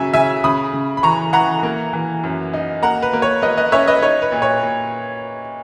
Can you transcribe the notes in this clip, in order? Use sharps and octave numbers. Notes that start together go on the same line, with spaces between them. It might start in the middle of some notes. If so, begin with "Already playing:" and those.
Already playing: C#3 F#3 E5 G#5
C#3 E5 G#5
C#3 B5 D#6
C#3
B5
E3 A#5 C#6
E3 F#5 A#5
A#3
E3
F#2
D#4
A#3 F#5 A#5
B4
A#3
C#5
A#3 B4 D#5
B4 D#5
C#4 C#5 E5
B4 D#5
D#4 C#5
B4
A#2
C#5
A#2